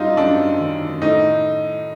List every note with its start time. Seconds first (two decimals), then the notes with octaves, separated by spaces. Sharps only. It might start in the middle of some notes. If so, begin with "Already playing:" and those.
Already playing: F#2 G3 D#4 F4
0.17 F#2 D4
0.60 D#3
1.02 A2 D#4